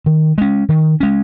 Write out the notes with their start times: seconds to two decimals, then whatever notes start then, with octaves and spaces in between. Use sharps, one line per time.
0.06 D#3
0.38 G#3 C#4
0.69 D#3
1.00 G#3 C#4